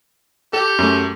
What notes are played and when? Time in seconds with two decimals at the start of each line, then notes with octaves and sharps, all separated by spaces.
0.53 G4 A4
0.79 F#2 A3